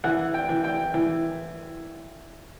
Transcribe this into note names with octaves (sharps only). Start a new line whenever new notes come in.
E3 F#5
G5
E3
G5
E3